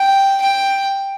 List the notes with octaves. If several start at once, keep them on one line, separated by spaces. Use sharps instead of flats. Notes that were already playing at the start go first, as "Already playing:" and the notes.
Already playing: G5
G5